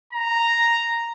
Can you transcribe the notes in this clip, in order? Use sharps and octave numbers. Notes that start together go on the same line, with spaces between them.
A#5